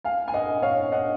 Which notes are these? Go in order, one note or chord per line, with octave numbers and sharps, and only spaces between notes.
F5 G#5
G#5
D#5 F#5
C#5 F5
D#5 F#5